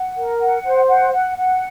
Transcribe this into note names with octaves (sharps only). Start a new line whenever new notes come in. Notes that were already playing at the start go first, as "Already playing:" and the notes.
Already playing: F#5
A#4
F#5
C5
F#5
F#5
F#5